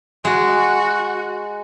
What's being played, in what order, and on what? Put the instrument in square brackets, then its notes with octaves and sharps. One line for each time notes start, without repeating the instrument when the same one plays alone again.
[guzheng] G#3 [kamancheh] F#4